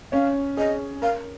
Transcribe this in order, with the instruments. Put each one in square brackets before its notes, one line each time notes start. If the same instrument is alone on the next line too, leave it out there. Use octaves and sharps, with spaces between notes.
[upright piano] C#4 C#5 [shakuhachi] F5
[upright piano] G#4 [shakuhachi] D#5
[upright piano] A#4 [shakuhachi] F5